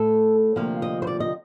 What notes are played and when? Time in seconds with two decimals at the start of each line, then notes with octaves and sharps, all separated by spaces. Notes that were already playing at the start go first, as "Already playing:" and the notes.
Already playing: A2 A3 A4
0.56 D2 C3 F3 A#3 F5
0.82 D#5
1.02 C5
1.07 D5
1.20 D#5